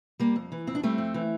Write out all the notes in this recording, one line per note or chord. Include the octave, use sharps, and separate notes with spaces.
G3 A#3
F2
E3
F2 C4
D4
G3 A3 C4
F2
E3